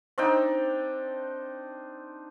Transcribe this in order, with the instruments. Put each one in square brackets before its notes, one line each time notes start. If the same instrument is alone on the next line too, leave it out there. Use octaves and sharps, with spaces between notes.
[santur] C4 D4 D#4 G5